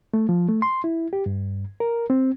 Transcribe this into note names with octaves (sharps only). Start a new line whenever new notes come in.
A3
F3
A3
C6
E4
G4
G2
A#4
C4